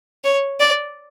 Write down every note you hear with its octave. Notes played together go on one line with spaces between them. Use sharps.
C#5
D5